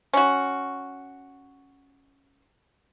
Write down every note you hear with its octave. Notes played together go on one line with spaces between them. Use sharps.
C#4 F#4